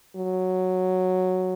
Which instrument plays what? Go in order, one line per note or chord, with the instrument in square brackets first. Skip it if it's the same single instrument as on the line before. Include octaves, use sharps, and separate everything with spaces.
[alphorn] F#3